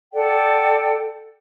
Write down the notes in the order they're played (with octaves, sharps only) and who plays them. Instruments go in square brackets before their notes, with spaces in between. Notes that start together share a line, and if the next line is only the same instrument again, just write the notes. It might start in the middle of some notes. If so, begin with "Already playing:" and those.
[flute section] A4 D5 F#5 G5